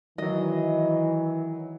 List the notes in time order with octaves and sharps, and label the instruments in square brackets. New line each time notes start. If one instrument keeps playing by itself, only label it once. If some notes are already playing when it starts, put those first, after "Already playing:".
[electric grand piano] D#3 F#3 [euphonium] E3 [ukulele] D#5